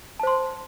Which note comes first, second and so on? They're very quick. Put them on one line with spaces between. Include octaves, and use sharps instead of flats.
A5 C5 C6